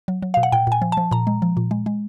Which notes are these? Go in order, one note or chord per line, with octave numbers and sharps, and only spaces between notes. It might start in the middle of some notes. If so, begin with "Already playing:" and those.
F#3
F#3
B2 F5
F#5
A#2 G5
A#2 G#5
F3
F3 A5
A#2 A#5
G#3
F3
A#2
G#3
G#3